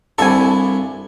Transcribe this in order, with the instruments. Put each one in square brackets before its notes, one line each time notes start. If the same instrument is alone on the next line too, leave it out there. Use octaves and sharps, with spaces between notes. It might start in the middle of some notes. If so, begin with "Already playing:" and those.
[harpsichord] C2 G2 E4 [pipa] A4 G#5